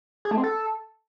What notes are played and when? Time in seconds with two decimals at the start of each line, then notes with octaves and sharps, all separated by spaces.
0.25 G#4
0.31 A3
0.37 C4
0.44 A4